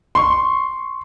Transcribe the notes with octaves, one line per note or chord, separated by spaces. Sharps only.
C6 C#6